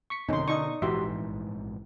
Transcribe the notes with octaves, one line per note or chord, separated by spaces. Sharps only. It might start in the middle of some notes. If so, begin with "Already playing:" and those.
C#6 B6 C#7
G#1 F2 B2 D3 C#4 D#4 C6
D#4 D5 C#6 D#6
A#1 G#2 E3 F#4 G4 E5 C6
A1